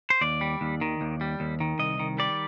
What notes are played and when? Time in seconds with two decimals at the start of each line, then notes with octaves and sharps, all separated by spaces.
0.10 C5
0.21 D#2 D5
0.41 G3
0.61 D#2
0.81 D#3
1.01 D#2
1.21 G3
1.40 D#2
1.60 D#3
1.79 C2 D#5
1.99 D#3
2.19 G3 D5